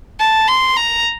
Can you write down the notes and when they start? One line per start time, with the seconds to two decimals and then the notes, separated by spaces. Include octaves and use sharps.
0.20 A5
0.48 C6
0.77 A#5